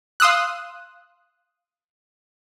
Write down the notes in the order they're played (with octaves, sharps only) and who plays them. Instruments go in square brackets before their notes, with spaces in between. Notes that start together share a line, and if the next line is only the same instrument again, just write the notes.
[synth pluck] F5 C6 D#6 E6 F#6